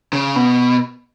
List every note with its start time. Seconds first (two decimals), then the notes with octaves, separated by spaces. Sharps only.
0.13 C#3
0.36 B2